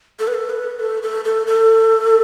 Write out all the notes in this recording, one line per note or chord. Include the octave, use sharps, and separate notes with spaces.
A4
B4
A4
B4
A4
A4
A4
A4